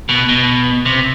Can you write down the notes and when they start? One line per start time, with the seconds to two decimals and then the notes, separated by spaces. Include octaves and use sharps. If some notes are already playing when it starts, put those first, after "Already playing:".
0.09 B2
0.29 B2
0.85 C3